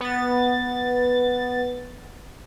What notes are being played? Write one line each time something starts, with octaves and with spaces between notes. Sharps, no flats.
B3 A6